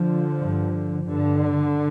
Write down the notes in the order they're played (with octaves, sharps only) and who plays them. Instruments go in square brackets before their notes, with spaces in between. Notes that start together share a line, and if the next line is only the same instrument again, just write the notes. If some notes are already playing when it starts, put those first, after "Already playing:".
Already playing: [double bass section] D3 F3
G2
G2 D3